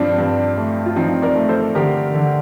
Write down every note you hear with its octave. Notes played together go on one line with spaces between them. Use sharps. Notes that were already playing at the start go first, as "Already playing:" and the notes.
Already playing: G2 F3 C4 D4
G2
A3
F4
F3 C4 D#4
A#4 D5
A3
A4 C5
D3 G4 A#4
D3